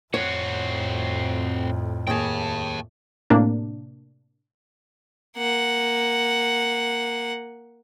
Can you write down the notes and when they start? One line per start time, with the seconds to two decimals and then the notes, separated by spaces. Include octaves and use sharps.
0.14 F2 A2 C4 F#4 C#5
2.07 D#2 G#4 G5 A5
3.30 A2 C3 A#3 D4
5.37 A#3 F#5